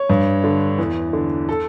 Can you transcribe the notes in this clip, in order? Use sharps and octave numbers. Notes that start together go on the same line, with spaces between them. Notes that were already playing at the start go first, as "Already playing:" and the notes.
Already playing: C#5
G2
D3
E2
D3
A4